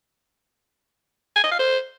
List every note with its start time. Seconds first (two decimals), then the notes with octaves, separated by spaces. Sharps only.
1.36 G#5
1.43 D#5
1.51 F5
1.59 C5